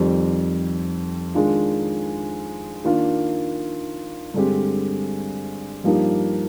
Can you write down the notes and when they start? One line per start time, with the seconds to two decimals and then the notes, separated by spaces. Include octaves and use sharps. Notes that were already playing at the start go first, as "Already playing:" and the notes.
Already playing: F2 D#3 G3 C4 G4
1.35 D#3 G#3 D4 F4
2.84 D#3 A#3 D4 F4
4.34 G2 D3 G#3 C4 G4
5.84 G2 F3 A#3 D#4 G4